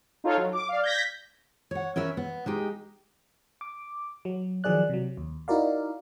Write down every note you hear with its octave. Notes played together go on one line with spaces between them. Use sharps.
D#4 F4 A4 C#5 F5
F#3
D6
D5 F5
G6 G#6 A#6 B6
C#5 F#5
C#4 A#4 B4 E5
B3
G#3 D#4 G4
D6
F#3
D#3 F3 F#3 G#4 D5 F#6
C3 F#3
D#2
D#4 E4 F#4 A#4 D5 F5